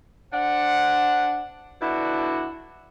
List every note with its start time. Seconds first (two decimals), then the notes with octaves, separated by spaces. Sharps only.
0.33 D4 C5 F#5
1.82 B2 D3 D4 E4 F#4